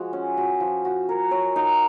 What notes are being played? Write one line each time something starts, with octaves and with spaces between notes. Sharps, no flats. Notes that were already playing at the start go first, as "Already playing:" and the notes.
Already playing: F3 G#3 F#4
C#4
F#4
F3
F#4
A#4
C#5
D#4